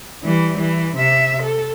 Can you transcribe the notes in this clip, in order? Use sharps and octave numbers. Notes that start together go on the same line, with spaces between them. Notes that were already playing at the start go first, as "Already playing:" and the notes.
E3 G3
E3
C3 E5
A4